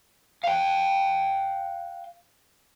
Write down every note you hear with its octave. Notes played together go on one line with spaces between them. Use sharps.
F5 G5